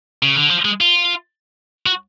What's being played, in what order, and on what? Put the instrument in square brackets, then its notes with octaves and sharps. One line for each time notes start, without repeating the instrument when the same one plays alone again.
[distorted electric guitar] C#3
D3
F3
G#3
F4
F#4